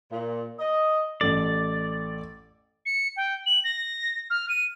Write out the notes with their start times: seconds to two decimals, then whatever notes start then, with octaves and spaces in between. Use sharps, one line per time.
0.10 A#2
0.59 D#5
1.21 A1 A4 D5
2.85 C#7
3.16 G5
3.46 F#7
3.64 A#6
4.30 F6
4.49 D#7